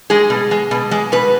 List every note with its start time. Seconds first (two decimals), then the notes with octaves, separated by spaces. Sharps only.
0.10 G#3 G#4
0.30 B2
0.51 G#3
0.71 B2
0.91 G#3
1.12 B2 B4